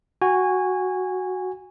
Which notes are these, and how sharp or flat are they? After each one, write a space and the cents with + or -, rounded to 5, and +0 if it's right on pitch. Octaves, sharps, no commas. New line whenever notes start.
F#4 +0 G#5 -20